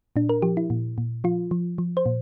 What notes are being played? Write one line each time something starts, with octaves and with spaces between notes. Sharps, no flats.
A#2 D4
A#4
F3 G4
E4
A#2
A#2
F3 F4
F3
F3
C5
A#2